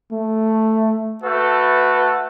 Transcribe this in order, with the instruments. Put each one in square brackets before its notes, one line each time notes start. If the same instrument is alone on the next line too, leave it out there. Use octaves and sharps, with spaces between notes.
[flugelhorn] A3
[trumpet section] A3 F#4 A4 [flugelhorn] B4